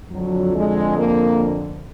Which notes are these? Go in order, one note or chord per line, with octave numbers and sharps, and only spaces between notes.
F2 D3 F#3
G#3
A#3